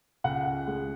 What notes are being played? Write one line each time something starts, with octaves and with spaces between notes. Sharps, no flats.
C#2 F#5
C#2
G#3